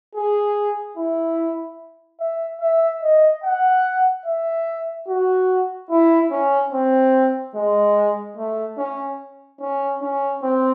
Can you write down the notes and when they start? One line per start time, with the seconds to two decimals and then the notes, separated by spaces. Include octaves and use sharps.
0.15 G#4
0.97 E4
2.20 E5
2.61 E5
3.03 D#5
3.44 F#5
4.26 E5
5.08 F#4
5.91 E4
6.31 C#4
6.73 C4
7.55 G#3
8.37 A3
8.78 C#4
9.61 C#4
10.02 C#4
10.43 C4